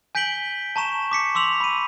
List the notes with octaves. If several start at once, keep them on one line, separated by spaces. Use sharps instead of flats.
G#5 G6 B6 D7 F#7 G7
A5 A#5 C#6 E7
D6 B6 C#7
C6 D6 E6 F7 F#7
B5 D#7